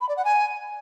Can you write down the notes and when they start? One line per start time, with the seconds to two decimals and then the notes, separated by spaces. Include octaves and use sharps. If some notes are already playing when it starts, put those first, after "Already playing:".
0.01 B5
0.09 D5
0.17 F#5
0.25 G#5